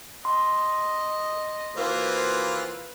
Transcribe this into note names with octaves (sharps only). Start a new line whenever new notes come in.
D#5 C6
E3 A#3 F4 F#4 B4 C5